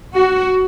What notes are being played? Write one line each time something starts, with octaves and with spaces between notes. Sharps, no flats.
F#4